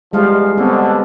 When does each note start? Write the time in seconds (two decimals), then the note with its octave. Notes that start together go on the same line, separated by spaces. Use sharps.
0.13 E2 F3 G3 G#3 F5
0.58 B2 D3 B3 C4